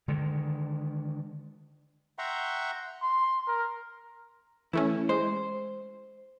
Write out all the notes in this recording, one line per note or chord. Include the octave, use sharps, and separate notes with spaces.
D3 D#3 G#3
E5 F#5 G5 A#5 C6 C#6
C6
A#4
E3 A3 C#4 E4
G#3 C5